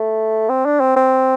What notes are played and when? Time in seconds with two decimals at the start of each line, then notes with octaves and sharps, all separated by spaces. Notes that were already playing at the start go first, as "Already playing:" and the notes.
Already playing: A3
0.49 C4
0.66 D4
0.80 C4
0.96 C4